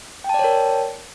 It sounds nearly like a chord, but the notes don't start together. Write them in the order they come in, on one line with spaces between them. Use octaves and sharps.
G5 A5 D5 C#5 A#4